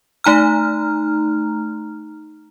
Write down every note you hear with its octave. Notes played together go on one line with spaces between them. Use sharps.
A3 D#4 A#5 F6